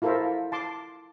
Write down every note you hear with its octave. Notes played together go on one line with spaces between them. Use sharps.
E4 F4 A4 A#4 C5 E5
A5 C6 D6